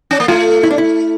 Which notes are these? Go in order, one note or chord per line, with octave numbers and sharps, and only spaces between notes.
C#4
A#3
A3 F4
E4
D4
E4